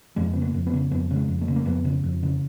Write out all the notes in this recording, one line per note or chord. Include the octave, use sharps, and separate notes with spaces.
F2 G#3
C#3 B3
A#3
F2
B3
C#3
F2 B3
C#3
G#3
F2
A#3
C#3
A#3
F2 B3
C#3
F2
C#3